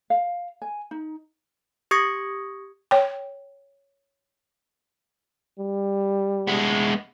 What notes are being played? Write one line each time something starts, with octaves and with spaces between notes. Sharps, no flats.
F5
G#5
D#4
G4 C#6 D#6 G#6 A#6 C#7
C#5 G5
G3
G#3 B3